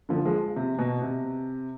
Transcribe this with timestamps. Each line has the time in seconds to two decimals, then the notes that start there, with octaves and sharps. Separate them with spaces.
0.09 D3 F3
0.25 F3 G#3
0.56 C3
0.79 B2
1.02 C3